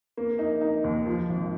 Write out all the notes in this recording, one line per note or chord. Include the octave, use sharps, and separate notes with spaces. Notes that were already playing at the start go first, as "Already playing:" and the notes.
A#3
D#4
D#4
D#2
F3
G#1